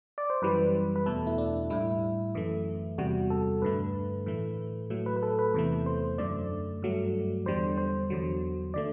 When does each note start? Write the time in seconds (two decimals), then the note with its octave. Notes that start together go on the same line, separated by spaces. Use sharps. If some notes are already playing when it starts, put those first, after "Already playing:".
0.18 D5
0.30 C5
0.42 F#2 E3 G3 B4
0.96 B4
1.06 E2 B2 A3 A4
1.27 E4
1.38 D4
1.70 A2 G3 E4
2.35 F#2 E3 A3
2.98 E2 C3 G3 F#4
3.30 A4
3.62 G2 D3 A3 B4
4.26 A2 E3 A3
4.90 A2 F#3 A3
5.06 B4
5.16 B4
5.23 A4
5.39 B4
5.54 E2 C3 E3 A3
5.86 C5
6.18 F#2 D3 A3 D5
6.83 G2 F#3 A3
7.46 E2 D3 G3 C5
7.78 C5
8.10 E2 D3 F#3
8.74 D3 A3 D5